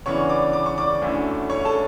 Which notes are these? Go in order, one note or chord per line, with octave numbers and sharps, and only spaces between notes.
C#3 E3 B3 D4 C#5 C#6
D5 D6
D6
C#6
D5 D6
D2 D3 A3 C#4 E4
C#5 C#6
A4 A5